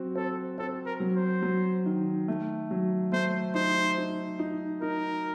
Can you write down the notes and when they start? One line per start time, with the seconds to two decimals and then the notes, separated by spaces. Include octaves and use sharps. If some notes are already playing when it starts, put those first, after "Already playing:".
Already playing: F#3 C4 F#4
0.15 C4 A4
0.58 C4 A4
0.86 A#4
1.00 F#3
1.15 C5
1.42 F#3
1.86 D#3
2.28 A3
2.71 F#3
3.12 A3 C5
3.55 D#4 C5
3.98 D#4
4.39 D#4
4.82 D#4 A#4